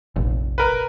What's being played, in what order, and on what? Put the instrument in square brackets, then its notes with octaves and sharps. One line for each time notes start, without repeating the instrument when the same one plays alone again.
[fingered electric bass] F1 A#1
[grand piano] A#4 B4